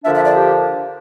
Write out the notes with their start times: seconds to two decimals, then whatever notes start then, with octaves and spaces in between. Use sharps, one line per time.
0.05 D3 F3 A#3 D4 E5
0.15 E5
0.26 D5
0.35 G4